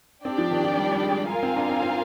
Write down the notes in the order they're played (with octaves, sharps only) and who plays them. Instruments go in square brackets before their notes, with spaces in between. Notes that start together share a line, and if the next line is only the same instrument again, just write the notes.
[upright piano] C4 [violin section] D4 G4 D5 G5
[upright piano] F3
D#3
F3
G3
G3
G#3
[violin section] F4 A#4 F5 G#5
[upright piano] C4
D4
C4
C4